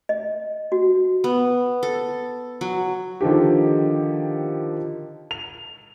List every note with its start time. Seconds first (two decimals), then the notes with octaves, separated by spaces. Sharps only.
0.09 D#5
0.72 F#4
1.24 B3
1.83 A4
2.61 F#3
3.21 D3 D#3 F3 G4
5.31 F7